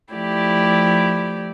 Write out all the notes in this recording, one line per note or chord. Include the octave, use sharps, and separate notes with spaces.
F3 A3 E4 G4 D5